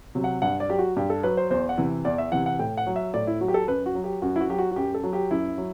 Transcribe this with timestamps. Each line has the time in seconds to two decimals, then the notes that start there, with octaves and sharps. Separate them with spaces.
0.15 C3 F#3
0.24 F#5
0.42 G2 F#5
0.60 D5
0.69 F#3 G4
0.79 F#4
0.96 G2 G4
1.10 A4
1.23 F#3 B4
1.37 C5
1.50 E2 C5
1.69 F#5
1.78 C3 E3
2.05 E2 D5
2.18 E5
2.32 C3 E3 F#5
2.46 F#5
2.59 A2 G5
2.77 F#5
2.87 F#3
2.96 E5
3.14 A2 D5
3.27 E4
3.41 F#3 F#4
3.48 G4
3.54 A4
3.68 F#2 B4
3.86 F#4
3.95 F#3
4.04 G4
4.22 F#2 F#4
4.36 E4
4.40 F#4
4.49 F#3 G4
4.58 F#4
4.71 F#4
4.76 F#2 G4
4.94 A4
5.03 F#3
5.13 G4
5.31 F#2 E4
5.58 F#3